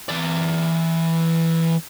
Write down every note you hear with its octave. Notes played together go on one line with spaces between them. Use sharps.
E3 D5